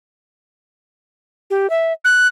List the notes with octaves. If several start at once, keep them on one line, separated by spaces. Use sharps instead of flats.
G4
E5
F#6